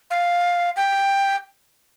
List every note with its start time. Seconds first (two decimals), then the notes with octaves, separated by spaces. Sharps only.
0.11 F5
0.76 G5